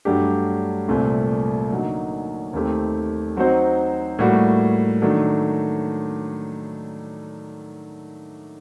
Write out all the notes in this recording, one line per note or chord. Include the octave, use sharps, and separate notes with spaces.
G2 F#3 A3 D4 G4
C2 A#2 A3 C4
D3 F#3 A#3 D#4
D#2 D#3 A3 C4 G4
F#3 C4 D#4 F#4 C5
A2 G3 A#3 F#4
D#3 F#3 A3 D4